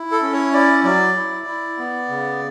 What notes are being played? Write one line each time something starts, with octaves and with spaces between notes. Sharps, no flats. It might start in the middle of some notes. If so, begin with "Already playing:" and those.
Already playing: E4
A4
C#4
C#5
E4 D5
F#3 D5
E4
E4
B3
C#3